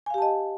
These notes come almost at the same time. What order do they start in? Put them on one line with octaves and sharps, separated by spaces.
G#5 F5 G4 A5 D#5